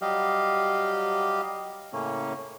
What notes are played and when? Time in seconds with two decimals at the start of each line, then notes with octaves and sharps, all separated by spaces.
0.02 F#3 G3 G4 D#5 F5
1.93 A2 C#3 A#3 C#4